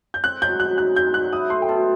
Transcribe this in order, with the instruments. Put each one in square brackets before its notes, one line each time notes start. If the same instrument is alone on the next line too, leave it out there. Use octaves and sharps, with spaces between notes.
[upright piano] G6
[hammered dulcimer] C4 [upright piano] F#6
[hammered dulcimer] F#3 [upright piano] G6
[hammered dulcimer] F#2 [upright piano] F#6
[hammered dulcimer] D#4 [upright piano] F#6
[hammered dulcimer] C4 [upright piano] G6
[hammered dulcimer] F#3 [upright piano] F#6
[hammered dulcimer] E4 [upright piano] D#6
[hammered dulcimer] A3 [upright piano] C6
[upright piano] G5
[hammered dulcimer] B2 [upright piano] A5